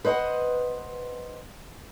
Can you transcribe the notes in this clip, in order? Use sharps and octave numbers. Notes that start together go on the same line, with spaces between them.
B4 C5 D#5 F5 F#5